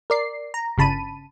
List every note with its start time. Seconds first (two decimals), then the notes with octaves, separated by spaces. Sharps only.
0.10 A#4 D5 C7
0.54 A#5
0.78 G1 C#3 A5 B5 D#7